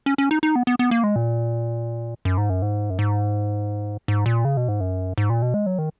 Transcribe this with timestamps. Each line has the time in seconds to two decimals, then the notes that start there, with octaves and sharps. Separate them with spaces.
0.06 C#4
0.18 C#4
0.31 D#4
0.43 D#4
0.55 B3
0.67 B3
0.79 B3
0.91 A#3
1.04 G#3
1.16 A#2
2.25 F#2
2.38 G#2
2.50 F#2
2.62 G#2
2.90 F#2
2.99 G#2
4.08 G#2
4.26 A#2
4.45 C#3
4.57 B2
4.68 G#2
4.80 F#2
5.18 G#2
5.30 A#2
5.42 B2
5.54 G#3
5.66 F#3
5.78 D#3